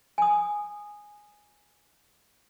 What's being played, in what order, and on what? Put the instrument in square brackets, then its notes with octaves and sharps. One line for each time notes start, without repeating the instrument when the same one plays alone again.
[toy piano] G#5 D#6